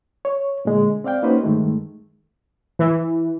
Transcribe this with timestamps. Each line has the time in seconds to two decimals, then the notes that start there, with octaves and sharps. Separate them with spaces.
0.25 C#5
0.65 A#2 D3 G#3
1.04 C4 D5 F5 G5
1.23 A#3 C#4 D#4 F#4 B4 C5
1.44 G2 D#3 G#3 A3
2.79 E3